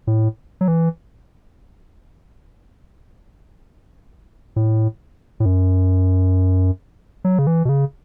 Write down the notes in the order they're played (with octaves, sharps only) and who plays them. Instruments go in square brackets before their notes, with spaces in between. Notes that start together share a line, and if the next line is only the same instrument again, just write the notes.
[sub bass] A2
F#3
E3
A2
A2
F#2
F#3
C#3
E3
B2
C#3